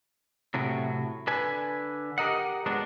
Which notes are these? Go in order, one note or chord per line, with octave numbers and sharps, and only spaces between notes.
A2 C3 F#3
D3 B4 G#5
G4 A#4 D#5 F#5
F#3 G#3 B3 D4